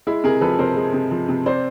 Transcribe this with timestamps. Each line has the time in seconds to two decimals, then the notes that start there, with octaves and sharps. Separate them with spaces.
0.07 G#3 E4
0.24 C3 G#4 A#4
0.41 F3 A4 B4
0.59 C3 A#4 C5
0.76 G#3
0.93 C3
1.11 F3
1.28 C3
1.46 C4 C5 D5